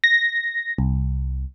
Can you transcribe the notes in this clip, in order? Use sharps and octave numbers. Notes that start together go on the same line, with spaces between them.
A#6
C2